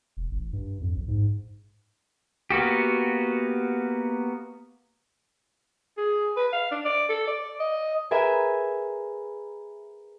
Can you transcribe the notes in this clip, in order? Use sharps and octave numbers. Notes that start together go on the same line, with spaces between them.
E1
A1
G2
F2
A#1
G#2
A#3 B3 F#4 G4
G#4
B4
F5
D4
D5
A4
D5
D#5
G#4 A#4 B4 E5 G#5